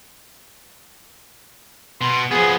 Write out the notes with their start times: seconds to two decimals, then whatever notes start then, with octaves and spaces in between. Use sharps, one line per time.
2.01 B2 C6
2.31 F3 B3 G#4